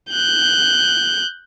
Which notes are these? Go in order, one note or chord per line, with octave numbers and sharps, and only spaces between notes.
F#6 G6